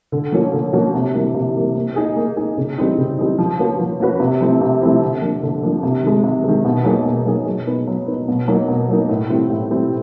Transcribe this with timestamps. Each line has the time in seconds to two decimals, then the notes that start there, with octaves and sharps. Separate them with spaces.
0.12 D3
0.32 F3 A#3 C#4 F#4
0.53 D3
0.73 F3 A#3 C#4 F#4
0.94 C3
1.14 E3 G3 A#3
1.34 C3
1.55 E3 G3 A#3
1.75 A#3
1.96 D#4 G#4
2.16 A#3
2.37 D#4 G#4
2.57 C#3
2.78 E3 G3 C4 D#4
2.98 C#3
3.18 E3 G3 C4 D#4
3.38 F3
3.59 A#3 C#4 F#4 B4
3.80 F3
4.00 A#3 C#4 F#4 B4
4.20 C3
4.41 F3 A3 C4 E4
4.61 C3
4.82 F3 A3 C4 E4
5.01 D3
5.21 F3 A#3 D4
5.43 D3
5.63 F3 A#3 D4
5.83 C3
6.03 D#3 G#3
6.24 C3
6.44 D#3 G#3
6.65 B2
6.84 F#3 A#3 D#4 G#4
7.05 B2
7.26 F#3 A#3 D#4 G#4
7.46 F#3
7.67 B3 D#4
7.87 F#3
8.07 B3 D#4
8.28 B2
8.48 F#3 A#3 D#4
8.68 B2
8.89 F#3 A#3 D#4
9.09 A2
9.29 E3 G3 C4 E4
9.50 A2
9.71 E3 G3 C4 E4